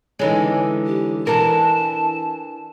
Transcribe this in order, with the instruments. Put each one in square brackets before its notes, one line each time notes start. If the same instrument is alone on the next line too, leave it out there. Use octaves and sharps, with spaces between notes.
[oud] D3 E3 G#3 [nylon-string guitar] C#4 D#4
[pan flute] G4
[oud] E3 D4 A#4 [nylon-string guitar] A4 [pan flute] A5